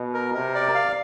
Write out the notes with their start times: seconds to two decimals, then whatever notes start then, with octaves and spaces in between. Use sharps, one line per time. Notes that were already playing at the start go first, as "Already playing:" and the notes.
Already playing: B2
0.14 A#4
0.34 C3 A#4
0.55 D5
0.75 F5